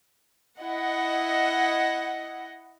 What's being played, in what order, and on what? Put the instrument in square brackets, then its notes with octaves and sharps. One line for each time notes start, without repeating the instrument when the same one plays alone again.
[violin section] E4 D#5 F#5